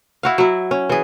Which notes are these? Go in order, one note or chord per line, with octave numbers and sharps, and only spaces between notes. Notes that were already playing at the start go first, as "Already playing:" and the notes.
E4 F#4 F5
F#3 E4
C#4
E3 G#4